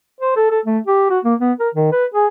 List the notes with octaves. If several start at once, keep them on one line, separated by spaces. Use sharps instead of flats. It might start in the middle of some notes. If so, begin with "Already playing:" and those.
C5
A4
A4
A3
G4
F#4
A#3
B3
A#4
D#3
B4
G#4